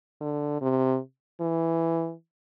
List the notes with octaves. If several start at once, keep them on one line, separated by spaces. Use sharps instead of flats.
D3
C3
E3